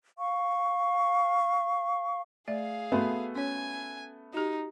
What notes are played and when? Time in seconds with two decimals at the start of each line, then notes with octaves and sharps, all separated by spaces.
0.18 F5 C#6
2.48 A3 G#4 D5 E5 F5
2.92 A3 B3 F#4 G#5 C6
3.35 C#4 C#5 G#5
4.33 D#4 F#4 G4